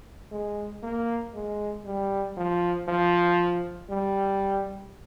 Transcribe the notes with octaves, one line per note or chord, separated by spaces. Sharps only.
G#3
A#3
G#3
G3
F3
F3
G3